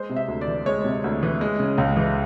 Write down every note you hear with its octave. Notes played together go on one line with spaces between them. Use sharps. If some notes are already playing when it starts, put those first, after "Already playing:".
Already playing: G#3 C5
C3
E5
D2
D5
E3
G#3 C#5
C3
D2
E3
G#3
C#3
C#2
E3